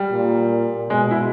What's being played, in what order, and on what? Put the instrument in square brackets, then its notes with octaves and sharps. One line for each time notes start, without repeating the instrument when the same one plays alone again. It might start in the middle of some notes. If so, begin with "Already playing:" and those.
Already playing: [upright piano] G3
[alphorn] A#2
[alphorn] B2 [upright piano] G#3
[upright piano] E4